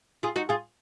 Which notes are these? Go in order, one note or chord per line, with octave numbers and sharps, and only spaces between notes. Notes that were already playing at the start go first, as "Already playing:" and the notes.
F4 G#4
D#4 F#4
F4 G#4